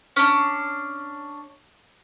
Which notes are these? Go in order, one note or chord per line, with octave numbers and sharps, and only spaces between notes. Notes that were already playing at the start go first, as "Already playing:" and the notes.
C#4 D4